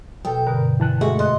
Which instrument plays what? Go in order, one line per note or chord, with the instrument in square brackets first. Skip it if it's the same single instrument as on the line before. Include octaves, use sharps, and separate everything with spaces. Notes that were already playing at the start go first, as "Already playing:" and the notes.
[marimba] B2 [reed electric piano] F#3 A4 [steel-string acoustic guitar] G5
[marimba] G2 B2 D3 [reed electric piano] A#4
[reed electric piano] E3 A5 F#6
[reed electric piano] G#3 A3 G4 [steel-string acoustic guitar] F#4 [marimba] E5
[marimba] F#2 C6 F#6 [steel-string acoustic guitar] D#5